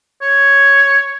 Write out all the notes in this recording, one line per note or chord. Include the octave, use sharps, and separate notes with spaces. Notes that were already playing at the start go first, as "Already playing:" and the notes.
C#5